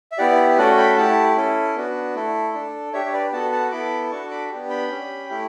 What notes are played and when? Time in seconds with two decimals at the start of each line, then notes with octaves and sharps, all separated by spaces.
0.12 E5
0.18 B3 E4 G4 D5 F#5
0.58 A3 C#4 F#4 A4 D5 F#5
0.77 G5 B5
0.97 A3 E4 G4 F#5 A5
1.36 C#4 E4 A4
1.76 B3 D4 F#4
2.15 A3 E4 A4
2.53 D4 A4
2.93 D4 G4 C#5 E5
3.06 C#5
3.13 B4 D5
3.32 B3 F#4 A4 F#5 A5
3.52 F#5 A5
3.71 B3 E4 A4 B5 D6
4.11 D4 F#4 A4 A5 C#6
4.31 B5 D6
4.50 B3 D4 G4
4.69 G5 B5
4.90 C#4 G4
5.29 A3 E4 G4